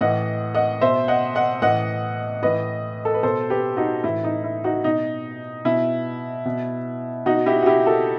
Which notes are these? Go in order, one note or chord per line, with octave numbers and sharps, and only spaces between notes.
A2 E3 D#5 F#5
D#5 F#5
B2 C5 E5
D#5 F#5
D#5 F#5
A2 E3 D#5 F#5
A2 E3 B4 D#5
A4
B4
B2 A4 C5
G4 B4
D#4 F#4
A2 E3 E4
D#4
E4
D#4 F#4
B2 D#4
B2 E4
B2
B2 D#4 F#4
E4 G4
F#4
E4 G4
F#4 A4